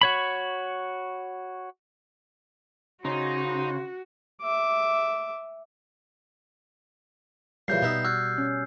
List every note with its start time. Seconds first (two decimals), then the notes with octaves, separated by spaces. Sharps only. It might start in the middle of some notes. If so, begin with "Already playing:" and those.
0.01 F#4 C#5 B5
3.05 C#3 D#4 F#4 C5
4.42 E5 D6
7.68 A#2 C#3 E3 G3 G6 C7
7.82 B2 B3 D#4 E5
8.05 F#4 E6 F6 G#6
8.38 C#4